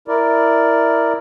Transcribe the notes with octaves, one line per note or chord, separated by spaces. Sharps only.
E4 A#4 D5